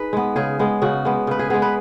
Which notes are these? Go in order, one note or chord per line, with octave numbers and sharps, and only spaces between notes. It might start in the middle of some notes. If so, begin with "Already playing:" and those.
Already playing: D#4 G#4 B4
G#3 B3
C#3 G#4
G#3 B3
C#3 F#4
G#3 B3
C#3 B4
G#4
G#3 B3 G#4
B4